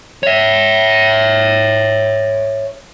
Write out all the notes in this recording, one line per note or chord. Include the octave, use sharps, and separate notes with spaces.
C#5 E5